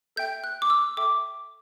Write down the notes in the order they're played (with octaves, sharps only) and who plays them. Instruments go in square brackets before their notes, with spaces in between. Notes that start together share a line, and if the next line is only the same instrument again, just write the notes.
[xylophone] A4 E5 G5 G6
F#6
D6
E6
A4 E5 G5 D6